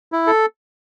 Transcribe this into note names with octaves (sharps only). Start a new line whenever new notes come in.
E4
A4